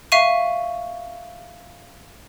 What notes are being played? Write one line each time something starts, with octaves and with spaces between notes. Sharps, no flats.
E5 F5 C#6 D#7